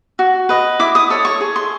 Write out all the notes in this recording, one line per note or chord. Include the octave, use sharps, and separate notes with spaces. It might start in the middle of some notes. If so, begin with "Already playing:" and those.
F#4
B4 D#5
E4 D6
D#6
A4 C#5
C#6
G#4
C6